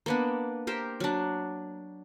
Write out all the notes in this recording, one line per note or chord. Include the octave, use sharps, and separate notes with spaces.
A#3 B3 D4
G4 A#4 C5
F#3 D4